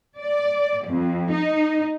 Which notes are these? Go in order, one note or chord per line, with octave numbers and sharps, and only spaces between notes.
D5
F2
D#4